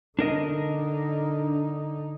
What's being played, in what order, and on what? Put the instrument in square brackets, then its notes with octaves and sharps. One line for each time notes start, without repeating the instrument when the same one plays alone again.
[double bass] D3 D#4 [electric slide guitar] D4 A#4 D#5